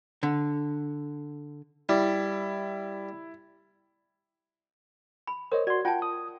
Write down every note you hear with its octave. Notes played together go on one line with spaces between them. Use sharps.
D3
G3 E4
B5
A#4 C5 C#5 D#5
F#4 D5 C6
F4 F#5 G5 A5
D#6